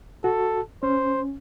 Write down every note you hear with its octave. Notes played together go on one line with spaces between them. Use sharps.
F#4 A4
C#4 C5